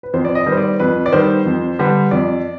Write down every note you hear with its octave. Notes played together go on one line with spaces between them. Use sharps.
B4
F2 C5
D5
D#5
D#3 G3 B3
C5
D5
F2 B4
D5
D#3 G3 B3 C5
F2
D3 G3 B3
F2 D5